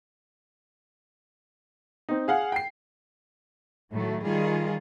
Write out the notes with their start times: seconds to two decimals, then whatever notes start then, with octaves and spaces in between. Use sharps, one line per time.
2.09 C4 D#4
2.28 G#4 F5 F#5
2.52 G5 C7
3.92 A2 D#3 F#3 A3
4.24 D#3 G3 F4 G#4